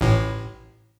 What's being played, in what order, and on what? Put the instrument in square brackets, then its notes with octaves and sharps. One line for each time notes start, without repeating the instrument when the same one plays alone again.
[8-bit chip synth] A1 A2